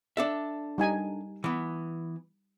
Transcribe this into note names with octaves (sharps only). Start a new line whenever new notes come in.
D4 A4 E5
G3 D#4 G#5
E3 B3